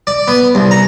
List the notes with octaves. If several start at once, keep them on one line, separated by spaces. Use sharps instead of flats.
D5
B3
C2
A#5